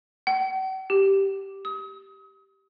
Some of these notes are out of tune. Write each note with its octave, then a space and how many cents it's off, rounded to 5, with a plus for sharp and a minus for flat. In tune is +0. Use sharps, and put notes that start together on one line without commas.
F#5 +45
G4 -5
D#6 +35